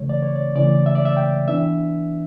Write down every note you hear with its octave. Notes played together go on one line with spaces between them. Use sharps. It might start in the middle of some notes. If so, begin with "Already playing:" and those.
Already playing: C#3 E3 A3 C#5
D5
C#5
D5
C#3 E3 A3 D5
E5
D5
E5
G5
E3 B3 D4 E5